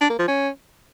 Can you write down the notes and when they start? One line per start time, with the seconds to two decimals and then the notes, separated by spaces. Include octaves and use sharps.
0.01 D4
0.10 A#3
0.19 F3
0.28 C#4